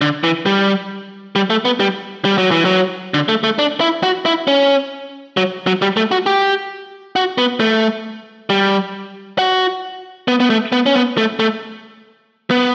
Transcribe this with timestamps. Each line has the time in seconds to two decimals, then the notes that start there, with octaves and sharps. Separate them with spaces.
0.01 D3
0.24 E3
0.46 G3
1.36 G3
1.50 A3
1.65 B3
1.80 G3
2.25 G3
2.38 F#3
2.51 E3
2.65 F#3
3.14 D3
3.28 A3
3.44 A3
3.59 D4
3.81 E4
4.03 F#4
4.26 E4
4.47 C#4
5.37 F#3
5.67 F#3
5.82 G3
5.97 A3
6.11 F#4
6.26 G4
7.16 F#4
7.38 B3
7.60 A3
8.50 G3
9.38 F#4
10.28 B3
10.40 B3
10.50 A3
10.72 B3
10.86 C#4
10.95 B3
11.17 A3
11.40 A3
12.51 B3